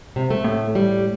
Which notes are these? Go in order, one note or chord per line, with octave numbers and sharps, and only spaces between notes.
C3
A3
A2
G3